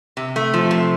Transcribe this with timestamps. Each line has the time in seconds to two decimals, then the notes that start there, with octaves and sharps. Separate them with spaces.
0.17 C3
0.36 A3
0.54 F3
0.71 C3